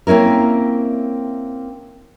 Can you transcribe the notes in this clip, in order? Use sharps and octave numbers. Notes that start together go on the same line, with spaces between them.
A#3 C4 C#4 E4 A#4